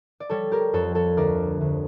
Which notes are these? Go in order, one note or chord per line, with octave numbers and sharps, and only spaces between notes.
D5
G3 A4 C#5
G4 A#4
F2 A4 C#5
A4 C#5
D2 A#4 D5
D2